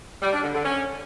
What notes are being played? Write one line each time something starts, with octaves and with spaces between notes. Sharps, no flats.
G3
D4
D3
D3
C#4